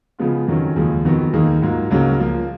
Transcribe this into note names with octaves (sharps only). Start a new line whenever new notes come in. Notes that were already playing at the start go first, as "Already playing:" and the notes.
C#3 F3 G#3 B3 F4
F2 D#3 F#3 C#4
D#2 C#3 F3 G#3
F2 D#3 F#3 B3 F#4
D#2 D#3 A#3 D#4 G#4
G#2 F#3 A#3 F4
C#2 C#3 F#3 A#3 C#4
F3 A#3 F4